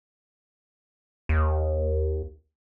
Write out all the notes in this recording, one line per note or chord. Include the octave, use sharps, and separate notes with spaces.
D#2